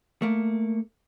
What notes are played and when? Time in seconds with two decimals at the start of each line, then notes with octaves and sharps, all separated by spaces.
0.22 A3 A#3